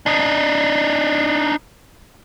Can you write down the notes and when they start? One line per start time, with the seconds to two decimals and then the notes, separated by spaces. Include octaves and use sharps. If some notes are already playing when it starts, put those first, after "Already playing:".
0.06 D4 D#4